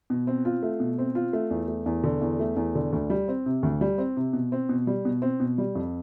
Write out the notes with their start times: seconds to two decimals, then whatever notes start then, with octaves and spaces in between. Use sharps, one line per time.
0.10 B2
0.27 C4
0.45 F4
0.63 A3
0.80 B2
0.98 C4
1.15 F4
1.33 A3
1.51 E2
1.68 A3
1.86 E2
2.03 D3
2.22 E2
2.39 A3
2.57 E2
2.75 D3
2.92 D2
3.10 G3
3.28 C4
3.46 C3
3.63 D2
3.81 G3
3.98 C4
4.17 C3
4.33 B2
4.52 C4
4.69 B2
4.87 G3
5.05 B2
5.22 C4
5.40 B2
5.58 G3
5.75 F2